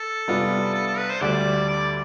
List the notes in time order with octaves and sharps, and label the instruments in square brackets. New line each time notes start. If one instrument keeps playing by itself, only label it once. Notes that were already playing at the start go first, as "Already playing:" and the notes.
Already playing: [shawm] A4
[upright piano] C3 G3 B3 D4 F4
[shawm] A4
A4
B4
C5
[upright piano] D2 D3 G3 D4 [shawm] D5
[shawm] D5